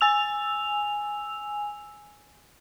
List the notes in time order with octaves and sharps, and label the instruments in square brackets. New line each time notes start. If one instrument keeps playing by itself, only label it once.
[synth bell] G#5 E6 F7